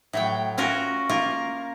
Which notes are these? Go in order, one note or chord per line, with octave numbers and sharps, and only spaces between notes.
A2 F#3 G5
C#4 F4 F#4 A#4
A#3 F4 A#4